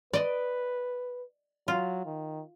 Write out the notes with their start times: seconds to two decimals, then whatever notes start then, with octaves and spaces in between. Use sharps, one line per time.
0.13 B4 D5 D#5
1.68 F#3 F4
2.06 D#3